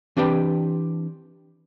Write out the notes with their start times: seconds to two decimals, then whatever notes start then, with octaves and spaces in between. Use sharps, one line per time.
0.17 E3 C4 D4 G4 B4 G5